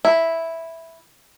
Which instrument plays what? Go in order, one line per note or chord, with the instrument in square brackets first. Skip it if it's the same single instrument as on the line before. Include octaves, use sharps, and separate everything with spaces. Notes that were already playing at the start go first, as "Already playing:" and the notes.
[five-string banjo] E4